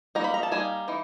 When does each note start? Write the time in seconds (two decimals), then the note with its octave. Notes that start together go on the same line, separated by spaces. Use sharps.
0.15 G3 A#3 D#4 A#5
0.24 B5
0.34 A#5
0.43 A5
0.51 G3 A#3 D#4 G#5
0.88 E3 D#4